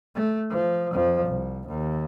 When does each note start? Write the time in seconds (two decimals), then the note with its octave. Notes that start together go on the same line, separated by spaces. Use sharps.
0.15 A3
0.50 F3
0.92 F2 F3
1.25 C2
1.67 D#2